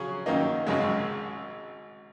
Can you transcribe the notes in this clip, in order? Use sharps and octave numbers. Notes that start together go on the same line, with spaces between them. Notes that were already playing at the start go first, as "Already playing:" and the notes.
Already playing: C#3 F#3 C#4 G#4
F#2 D#3 A#3 D#4
G#1 F#2 C#3 G#3